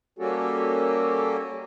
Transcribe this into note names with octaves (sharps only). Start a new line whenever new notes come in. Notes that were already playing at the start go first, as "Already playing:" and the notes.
G3 A#3 C#4 F#4 G4 A4